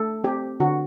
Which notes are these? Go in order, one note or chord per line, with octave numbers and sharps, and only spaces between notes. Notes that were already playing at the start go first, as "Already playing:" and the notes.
Already playing: A3 A4
C4 G4
D3 F#4